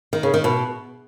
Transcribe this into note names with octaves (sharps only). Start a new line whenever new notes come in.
D#3
C#3
D#3
B2